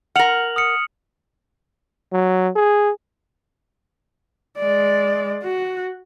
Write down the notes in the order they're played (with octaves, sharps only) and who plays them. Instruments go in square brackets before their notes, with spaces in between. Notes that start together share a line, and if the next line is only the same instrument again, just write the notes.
[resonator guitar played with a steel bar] A#4 F#5 [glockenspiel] F6 F7 F#7
[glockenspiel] D#6 F6 C#7
[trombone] F#3
G#4
[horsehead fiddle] G#3 D5
F#4